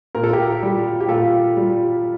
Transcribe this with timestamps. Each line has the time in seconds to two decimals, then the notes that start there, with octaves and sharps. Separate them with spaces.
0.15 A#2 A#4
0.24 A4
0.33 G4 A#4
0.63 G3
1.01 G4
1.09 A#2 F4 A4
1.57 G3